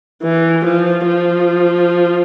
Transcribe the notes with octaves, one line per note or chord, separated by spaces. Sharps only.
E3
F3
F3